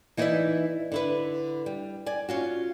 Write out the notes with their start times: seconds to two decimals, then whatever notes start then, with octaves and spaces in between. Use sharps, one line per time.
0.17 E3 D#4 E4 B4 D5 E5
0.92 D3 E4 B4
1.66 G3
2.06 D5 G#5
2.29 C#4 F4 F#4